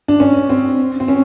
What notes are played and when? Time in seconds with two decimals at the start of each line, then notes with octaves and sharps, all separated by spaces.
0.08 D4
0.20 C#4
0.49 C4
1.00 C4
1.08 C#4